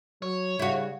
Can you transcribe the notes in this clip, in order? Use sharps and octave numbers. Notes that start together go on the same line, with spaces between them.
F#3 C#5
C#3 G3 E4 F#4